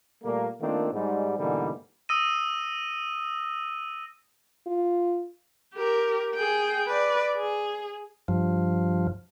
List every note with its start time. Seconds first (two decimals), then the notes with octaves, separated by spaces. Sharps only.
0.23 A#2 G3 A3 A#3
0.60 D#3 A3 A#3 C4 D4 F4
0.92 G#2 G3
1.38 G#2 B2 D3 E3 G3 A#3
2.09 D#6 E6 A#6 D#7
4.67 F4
5.75 G4 A#4
6.35 G#4 G5
6.87 B4 D5
7.37 G#4
8.28 G2 F3